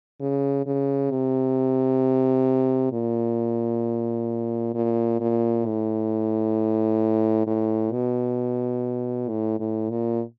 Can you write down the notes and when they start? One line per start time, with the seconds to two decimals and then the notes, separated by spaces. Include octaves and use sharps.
0.21 C#3
0.66 C#3
1.11 C3
2.93 A#2
4.75 A#2
5.21 A#2
5.66 A2
7.47 A2
7.93 B2
9.29 A2
9.60 A2
9.90 A#2